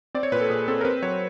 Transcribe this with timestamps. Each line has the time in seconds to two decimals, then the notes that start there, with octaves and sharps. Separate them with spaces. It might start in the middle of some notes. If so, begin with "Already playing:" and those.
0.14 C4 D5
0.23 C#5
0.32 A#2 B4
0.41 A4
0.50 A#2 G#4
0.68 C4 A4
0.81 A#4
0.85 C4 B4
1.02 F#3 C#5